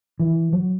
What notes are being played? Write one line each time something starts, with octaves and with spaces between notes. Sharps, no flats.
E3
F#3